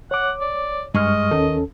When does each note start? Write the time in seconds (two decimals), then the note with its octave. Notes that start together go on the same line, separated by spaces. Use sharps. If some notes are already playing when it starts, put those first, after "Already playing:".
0.11 C#5 F#5 D6
0.41 D5
0.94 G2 G#3 D#5 C#6 F6
1.31 D#2 D#3 C#4 A4